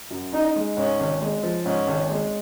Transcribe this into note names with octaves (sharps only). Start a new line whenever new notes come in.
F#2
C#4 D#4
G#3
G#2 C#4
G#1
G#3
F3
G#2 C#4
G#1
G#3